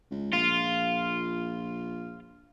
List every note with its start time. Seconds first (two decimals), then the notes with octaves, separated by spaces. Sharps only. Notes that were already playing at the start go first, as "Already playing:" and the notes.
0.11 C#2
0.33 A#1 F4